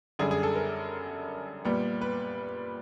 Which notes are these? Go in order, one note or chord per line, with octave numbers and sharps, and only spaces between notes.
F#2 D3 G3 G#4
G#4
A4
A#4
A#2 G3 B3
B4